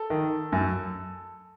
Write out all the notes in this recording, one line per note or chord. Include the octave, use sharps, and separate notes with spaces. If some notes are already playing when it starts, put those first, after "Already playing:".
Already playing: A4
D#3
F#2